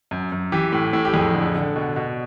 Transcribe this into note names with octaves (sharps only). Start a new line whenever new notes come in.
F#2
F#2
E3 G4
A2
A2
G4
F2 G#4
D3
D3
B2
B2